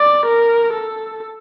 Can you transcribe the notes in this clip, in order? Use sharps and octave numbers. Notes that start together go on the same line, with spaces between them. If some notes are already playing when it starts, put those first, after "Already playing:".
Already playing: D5
A#4
A4